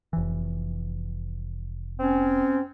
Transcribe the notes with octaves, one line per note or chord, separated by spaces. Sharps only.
F1 E3
C4 C#4